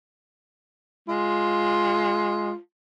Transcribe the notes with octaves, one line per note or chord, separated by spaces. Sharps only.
G#3 F4